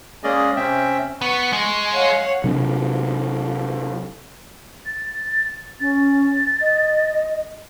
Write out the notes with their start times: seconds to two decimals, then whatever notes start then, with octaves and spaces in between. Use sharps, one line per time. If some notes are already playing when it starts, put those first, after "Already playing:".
0.24 G#3 A#3 C#4 G#4 D5 D#5
0.56 C3 C4 C#4 E5 G5
1.21 B3 C#6
1.53 G#3
1.91 C#5 F5 F#5
2.44 C3 F#3 C4 D4
4.86 A6
5.80 C#4 A6
6.61 D#5